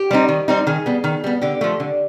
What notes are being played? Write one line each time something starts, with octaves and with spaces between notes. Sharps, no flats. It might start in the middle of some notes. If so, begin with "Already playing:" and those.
Already playing: G4
G3 C4 D#4
D#3
G3 C4 D#4
D#3 G#4
G3 B3
D#3
G3 B3
D3 G4
F3 A3
D3